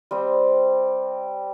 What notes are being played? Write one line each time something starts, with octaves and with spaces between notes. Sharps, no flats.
G3 C4 D#5